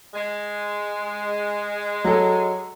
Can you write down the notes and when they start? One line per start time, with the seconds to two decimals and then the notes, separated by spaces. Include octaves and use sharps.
0.14 G#3
2.04 F#3 A4